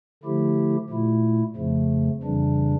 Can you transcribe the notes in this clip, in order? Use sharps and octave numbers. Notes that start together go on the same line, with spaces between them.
D3 F3 A3 E4 G4
A#2 A3 E4
F2 C#3 F3 A3
F2 C#3 E3 G3 D4